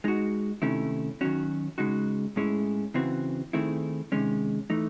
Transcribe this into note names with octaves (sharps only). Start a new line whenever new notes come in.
G#3 D#4 F#4
C3 D#3 A3 C#4 E4
D#3 F#3 C#4 F#4
C#3 G#3 D#4 F#4
A2 G#3 C#4 E4 G#4
C#3 E3 C4 F#4
D#3 A3 C4 E4 G#4
C3 D#3 G#3 C#4
E3 A3 D#4